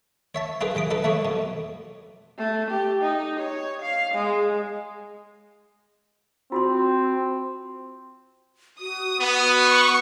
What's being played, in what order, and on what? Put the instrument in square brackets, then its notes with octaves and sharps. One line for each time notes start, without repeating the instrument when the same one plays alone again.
[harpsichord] C#5 E5 A5
E4 F4 G#4 A#4 B4
C2 E3 D6 D#6
D4 D#4 A4 B4
E3 A3 A#3 E4 C#5
F2 B2
[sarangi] A3
G4
D#4
C#5
F5
G#3
[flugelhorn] C4 [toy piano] F4 F#4 C6
[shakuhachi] F#4 [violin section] D#6
[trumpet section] B3
[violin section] C#6